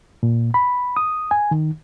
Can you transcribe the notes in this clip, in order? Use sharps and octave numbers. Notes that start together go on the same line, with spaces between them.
A#2
B5
D#6
G#5
D#3